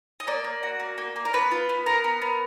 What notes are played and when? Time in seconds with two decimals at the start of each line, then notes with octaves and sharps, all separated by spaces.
0.20 D#5
0.27 A#3 D5
0.44 A#3
0.63 F#4
0.80 A#3
0.98 A#3
1.16 A#3
1.25 A#4
1.33 B3 B4
1.51 F4
1.69 B3
1.86 B3 A#4
2.04 B3
2.22 B3